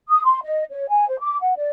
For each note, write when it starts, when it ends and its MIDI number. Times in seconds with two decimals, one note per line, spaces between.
0.08 0.23 87
0.24 0.39 84
0.44 0.64 75
0.71 0.87 73
0.89 1.07 80
1.08 1.19 72
1.20 1.38 86
1.41 1.54 78
1.57 1.70 74